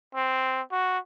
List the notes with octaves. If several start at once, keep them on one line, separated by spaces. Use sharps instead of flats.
C4
F#4